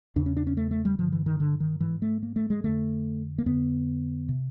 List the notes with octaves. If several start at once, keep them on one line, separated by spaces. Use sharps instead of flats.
E2 C#3 D4
C#4
D4
C#4
A3
A3
G3
G2 D3 F3
E3
D#3
D3
D#3
G#2 E3
A3
A#3
A3
G#3
F2 D3 A3
A#3
F2 D3 B3
C3